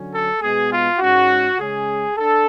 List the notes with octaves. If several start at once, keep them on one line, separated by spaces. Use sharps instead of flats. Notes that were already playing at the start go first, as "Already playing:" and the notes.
Already playing: D3 F#3 C#4
A4
B2 G#3 B3 G#4
F4
G#2 G#3 C#4 F#4
C#3 G#3 C#4 G#4
D4 A4